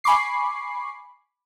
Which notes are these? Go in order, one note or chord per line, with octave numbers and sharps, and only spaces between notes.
G#5 B5 C#6 D6 C7